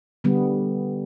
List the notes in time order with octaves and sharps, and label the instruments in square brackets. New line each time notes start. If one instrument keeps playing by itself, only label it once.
[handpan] D3 G3 B3